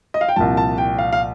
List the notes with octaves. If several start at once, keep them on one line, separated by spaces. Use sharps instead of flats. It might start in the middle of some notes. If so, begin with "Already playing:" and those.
D#5
F5
G5
C2 A#2 F3 A5
A5
G5
F5
F5